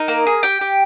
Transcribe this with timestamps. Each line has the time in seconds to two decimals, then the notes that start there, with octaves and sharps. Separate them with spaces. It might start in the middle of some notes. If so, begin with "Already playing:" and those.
Already playing: D#4 A#4
0.08 A#3
0.27 G#4
0.43 G4 G5
0.61 G4